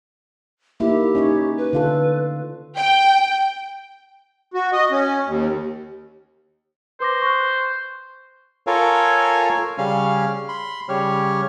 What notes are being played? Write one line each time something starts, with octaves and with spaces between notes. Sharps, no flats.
A#3 D#4 E4 G4
C#4 D#4 C#5
B4
D3 F4 A4
G5
F#4
D#5
C#4
D#2
B4 C5 D6 A#6
C#6 F#6
F4 A4 A#4 C#5 F5 G#5
C#3 G3 C#4 F5 F6
B5 C6
C#3 G3 G4 C#5 F6